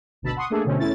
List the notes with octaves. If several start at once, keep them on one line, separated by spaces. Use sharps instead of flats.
G#1 D2 B2 A5 B5 E6
F#5 C6 C#6 D#6
A3 A#3 D4 G#4 A4
B2 D3 A3 C4 C#4
E2 A3 C#4 E4 A6